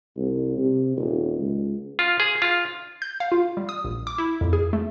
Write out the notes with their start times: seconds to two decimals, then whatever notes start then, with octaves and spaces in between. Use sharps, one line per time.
0.17 C2
0.58 C3
0.97 D#1
1.39 C#2
1.99 F4
2.20 G#4
2.42 F4
3.02 G6
3.20 F5
3.32 F4
3.57 G3
3.69 D#6
3.84 A#1
4.07 D6
4.18 E4
4.41 F2
4.53 G#4
4.73 A3